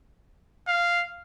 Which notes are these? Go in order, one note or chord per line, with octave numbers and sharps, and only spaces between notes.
F5